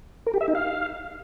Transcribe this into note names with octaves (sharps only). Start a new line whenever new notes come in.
A#4
G4
E5
D#4
F5